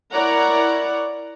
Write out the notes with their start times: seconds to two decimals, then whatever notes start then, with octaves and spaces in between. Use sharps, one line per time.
0.13 E4 A#4 C#5 D5 F#5 A#5